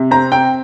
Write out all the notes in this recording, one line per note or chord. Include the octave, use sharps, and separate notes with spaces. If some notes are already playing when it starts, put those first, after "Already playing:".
Already playing: C3
C4 A#5
C4 G5